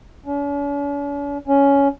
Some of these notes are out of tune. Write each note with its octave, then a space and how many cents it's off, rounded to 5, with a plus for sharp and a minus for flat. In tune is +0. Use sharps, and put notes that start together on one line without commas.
C#4 +45
C#4 +10